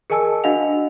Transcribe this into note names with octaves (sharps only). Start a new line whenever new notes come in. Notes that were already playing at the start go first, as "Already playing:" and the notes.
G#4 A#4 D#5 G#5 A5 E6
D4 F#4 D#5 F5 F#5 F7